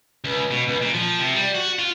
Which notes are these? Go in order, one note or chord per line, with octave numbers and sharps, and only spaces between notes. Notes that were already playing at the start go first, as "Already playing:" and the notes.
C#2
B2
C#2
A#2
F3
C3
G3
F#4
F4